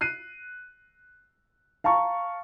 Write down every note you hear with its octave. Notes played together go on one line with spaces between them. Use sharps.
F#6 C7 D#7
F5 A5 A#5 C#6